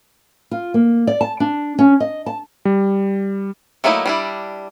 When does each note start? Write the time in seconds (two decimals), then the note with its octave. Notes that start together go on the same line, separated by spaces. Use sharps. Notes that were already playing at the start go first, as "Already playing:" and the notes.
0.51 F4
0.74 A#3
1.07 D5
1.21 A5
1.40 D4
1.79 C#4
2.00 D#5
2.26 A5
2.65 G3
3.84 F#3 A3 A#3 D#4 E4
4.06 G3 D4 E4